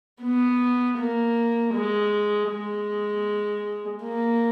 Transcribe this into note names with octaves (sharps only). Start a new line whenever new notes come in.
B3
A#3
G#3
G#3
A#3